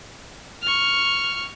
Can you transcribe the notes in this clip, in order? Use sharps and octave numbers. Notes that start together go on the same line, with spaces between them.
C#6 F6